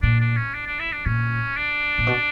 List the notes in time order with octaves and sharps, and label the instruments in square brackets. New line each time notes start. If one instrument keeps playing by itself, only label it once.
[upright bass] A#2 [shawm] D4
[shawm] D4
C#4
D4
D4
E4
D4
[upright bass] A#2 [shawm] C#4
[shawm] D4
[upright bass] A#2
B2